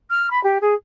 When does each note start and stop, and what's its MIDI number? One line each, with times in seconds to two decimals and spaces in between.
0.10 0.30 89
0.31 0.42 83
0.43 0.58 67
0.61 0.74 68